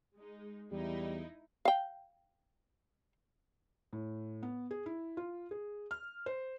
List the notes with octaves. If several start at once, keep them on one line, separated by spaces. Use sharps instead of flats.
G#3 D#4
E2 G3 D#4 E4
F5 G5
A2
B3
G#4
E4
F4
G#4
F6
C5